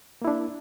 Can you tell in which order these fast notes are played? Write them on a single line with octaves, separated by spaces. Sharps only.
A#3 E4 D4